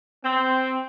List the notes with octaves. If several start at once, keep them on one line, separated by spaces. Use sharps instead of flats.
C4